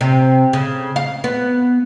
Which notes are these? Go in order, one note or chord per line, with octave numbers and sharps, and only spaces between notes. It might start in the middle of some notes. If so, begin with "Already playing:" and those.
C3
C#3
F5
B3